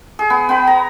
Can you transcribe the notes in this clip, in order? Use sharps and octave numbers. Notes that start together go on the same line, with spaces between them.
G#4
B3
B3 B5
A#5